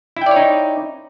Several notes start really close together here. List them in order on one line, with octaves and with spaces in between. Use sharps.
E4 G5 D5 C#5 D#4